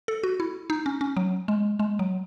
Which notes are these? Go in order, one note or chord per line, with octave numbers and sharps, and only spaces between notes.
A4
F#4
E4
D#4
C#4
C#4
F#3
G#3
G#3
F#3